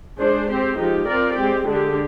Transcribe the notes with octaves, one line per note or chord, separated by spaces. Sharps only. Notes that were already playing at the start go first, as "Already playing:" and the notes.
G#3 D4 G#4 C5
C4 G4 C5
F3 G#3 D#4 G4
C4 F4 A#4 D5
G#3 C4 G4
D3 G#3 D4 G4